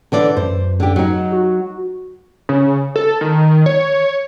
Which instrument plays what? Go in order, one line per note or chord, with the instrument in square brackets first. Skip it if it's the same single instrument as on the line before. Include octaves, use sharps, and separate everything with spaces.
[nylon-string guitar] D3 E3 D5
[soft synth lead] F#2 [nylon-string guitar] C5
[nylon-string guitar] D3 G4
F#3 D#4
[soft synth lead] F#4
[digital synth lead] C#3
A4
D#3
C#5